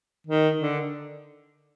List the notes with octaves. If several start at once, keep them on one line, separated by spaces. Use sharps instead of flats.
D#3
D3